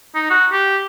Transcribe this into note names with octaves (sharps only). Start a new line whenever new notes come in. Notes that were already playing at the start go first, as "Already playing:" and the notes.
D#4
F#4
G4